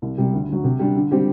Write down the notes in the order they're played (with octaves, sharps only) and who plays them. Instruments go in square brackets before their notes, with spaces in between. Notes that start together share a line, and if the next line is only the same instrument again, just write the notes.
[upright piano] C2
C3 G3
D2
D3 F#3
C3
G3 D4
D3
G3 C4 G4